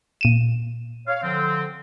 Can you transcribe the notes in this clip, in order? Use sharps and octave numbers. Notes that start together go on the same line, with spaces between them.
A#2 D#7 E7
C#5 F5
D3 F3 C4